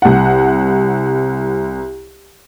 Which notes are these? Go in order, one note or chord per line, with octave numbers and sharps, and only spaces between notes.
C2 F#5